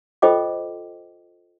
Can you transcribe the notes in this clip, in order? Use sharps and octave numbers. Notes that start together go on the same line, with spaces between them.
F4 A4 C5 D#5 G5 D6